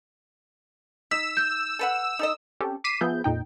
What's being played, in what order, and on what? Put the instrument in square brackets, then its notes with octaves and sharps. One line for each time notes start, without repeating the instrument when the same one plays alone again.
[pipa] D#4 [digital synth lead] E6 [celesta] B6
[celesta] G6
[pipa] A4 B4 F#5
D#4 A4 D#5
[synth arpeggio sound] C4 C#4 G4 A4
D6 B6 C7 D#7 E7
F3 B3 G#4 E5 G6
F2 A#2 D#4 G5